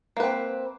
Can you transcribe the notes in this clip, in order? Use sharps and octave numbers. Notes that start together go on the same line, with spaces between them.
A#3 C4 B4